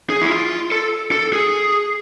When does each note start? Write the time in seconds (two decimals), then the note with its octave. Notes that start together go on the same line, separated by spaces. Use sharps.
0.10 G#4
0.22 E4
0.30 F4
0.72 A4
1.11 A4
1.33 G#4